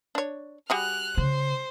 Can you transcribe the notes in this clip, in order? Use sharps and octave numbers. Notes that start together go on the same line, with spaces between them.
D4 C#5
G3 F#4 G#4 F6 F#6
C#3 C5